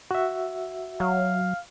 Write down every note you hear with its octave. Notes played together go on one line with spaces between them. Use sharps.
F#4 E5
F#3 F5